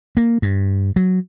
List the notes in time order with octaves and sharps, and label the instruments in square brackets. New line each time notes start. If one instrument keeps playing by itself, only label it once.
[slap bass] A#3
G2
F#3